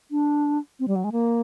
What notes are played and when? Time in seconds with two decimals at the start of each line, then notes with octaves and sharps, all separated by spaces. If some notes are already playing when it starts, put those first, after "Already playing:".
0.11 D4
0.80 C4
0.88 G3
0.96 F#3
1.04 G#3
1.12 A#3